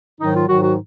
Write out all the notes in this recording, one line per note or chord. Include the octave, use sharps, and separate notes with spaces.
G#2 D#3 F#3 D#4
F4
G#2 D#3 F#3 F#4
F#4